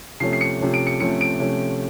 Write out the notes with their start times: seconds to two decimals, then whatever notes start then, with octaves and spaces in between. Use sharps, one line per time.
0.20 C3 F3 A3 C#4 C7
0.33 C7
0.41 C#7
0.61 C3 F3 A3 C#4
0.74 D7
0.87 C#7
1.00 C3 F3 A3 C#4 C#7
1.21 D7
1.40 C3 F3 A3 C#4